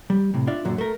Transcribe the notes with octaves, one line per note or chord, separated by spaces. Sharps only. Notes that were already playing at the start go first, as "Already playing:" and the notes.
G3
A2 C3
D4 F4 D5 E5
F#2 A#2 D3 F#3
A3 A#4